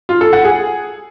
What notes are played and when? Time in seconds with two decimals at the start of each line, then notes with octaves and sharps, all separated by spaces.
0.09 F4
0.21 A4
0.33 F#5
0.45 G#4